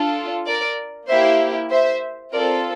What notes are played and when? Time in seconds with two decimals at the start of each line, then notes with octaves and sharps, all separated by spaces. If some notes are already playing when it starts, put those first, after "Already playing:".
Already playing: D4 F4 A4
0.46 A#4 D5
1.08 A#3 E4 G4 C5 E5
1.70 C5 E5
2.32 C4 F4 A4 A#4 D5